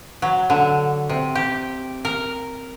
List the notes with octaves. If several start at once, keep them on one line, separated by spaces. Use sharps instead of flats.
F#3
D3
C3
G4
A#4